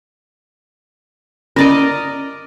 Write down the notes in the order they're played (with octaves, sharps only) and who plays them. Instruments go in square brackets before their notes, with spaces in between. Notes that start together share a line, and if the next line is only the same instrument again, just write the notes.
[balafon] C#4 [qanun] A#4 D5 D#5